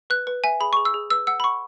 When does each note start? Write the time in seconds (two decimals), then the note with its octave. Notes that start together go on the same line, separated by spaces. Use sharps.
0.10 B4 F#6
0.27 B4
0.44 E5 G#5
0.60 G#4 B5
0.73 G#4 C#6
0.85 E6
0.94 G#4
1.10 B4 E6
1.27 F#5 E6
1.40 B5
1.44 F#5 C#6